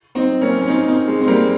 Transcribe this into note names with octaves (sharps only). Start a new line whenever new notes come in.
C4 D#4
A#3 C#4
C#4
C4 D#4
C4 D#4
G#3
C4
G3 A#3